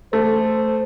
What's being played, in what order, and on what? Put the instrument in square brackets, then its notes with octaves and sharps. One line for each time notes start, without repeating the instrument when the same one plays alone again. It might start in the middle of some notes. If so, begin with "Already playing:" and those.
[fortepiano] A3 [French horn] C5